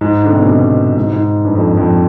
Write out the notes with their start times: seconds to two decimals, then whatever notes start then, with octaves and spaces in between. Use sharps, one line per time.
0.01 G#2
0.23 D3
0.32 C3
0.41 B2
0.48 G#2
0.96 G#2
1.13 G#2
1.45 G2
1.55 F2
1.77 F2